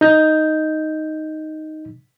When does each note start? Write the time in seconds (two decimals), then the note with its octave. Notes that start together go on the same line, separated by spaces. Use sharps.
0.01 D#4 G6